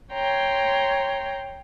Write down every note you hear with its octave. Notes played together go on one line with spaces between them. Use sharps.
C#5 G5 A#5 C6